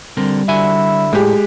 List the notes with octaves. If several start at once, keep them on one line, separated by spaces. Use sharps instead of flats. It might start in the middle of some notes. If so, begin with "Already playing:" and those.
D3 G3 C4 A#4
D3 E4 F#4 G#5
A2 G#3 G4